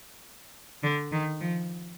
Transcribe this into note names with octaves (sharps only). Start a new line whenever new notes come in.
D3
D#3
F3